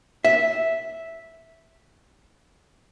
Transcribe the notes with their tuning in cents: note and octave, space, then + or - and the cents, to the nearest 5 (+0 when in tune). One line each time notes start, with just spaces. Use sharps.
E5 -5